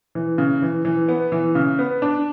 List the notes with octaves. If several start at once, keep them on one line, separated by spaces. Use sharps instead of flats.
E3
C#3
E3
E3
B3
E3
C#3
B3
D4